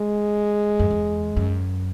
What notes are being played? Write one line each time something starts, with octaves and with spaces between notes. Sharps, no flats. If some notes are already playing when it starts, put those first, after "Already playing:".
Already playing: G#3
F#2
E2
F#2